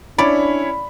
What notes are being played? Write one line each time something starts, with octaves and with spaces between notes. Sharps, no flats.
C#4 D4 E4 C#5 D5 B5